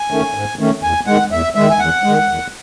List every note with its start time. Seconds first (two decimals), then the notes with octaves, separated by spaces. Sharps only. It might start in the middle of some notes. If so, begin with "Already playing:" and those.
Already playing: G#5
0.11 D#3 A3 C#4
0.35 G#2
0.59 D#3 A3 C#4
0.83 E2 G#5
1.07 D#3 G#3 F#5
1.31 E2 E5
1.55 D#3 G#3 E5
1.70 G#5
1.79 E2 F#5
2.03 G#3
2.09 D#3
2.28 E2